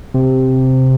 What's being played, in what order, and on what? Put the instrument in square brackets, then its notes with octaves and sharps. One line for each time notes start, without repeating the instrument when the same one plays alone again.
[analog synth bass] C3